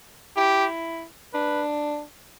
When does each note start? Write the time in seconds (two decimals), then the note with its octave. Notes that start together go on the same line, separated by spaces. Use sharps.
0.36 E4 G4
1.33 D4 B4